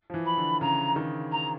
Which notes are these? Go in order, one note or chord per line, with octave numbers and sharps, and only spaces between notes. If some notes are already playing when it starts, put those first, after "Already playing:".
F3
E3
B5
D3
C#3 A#5
D#3
A#5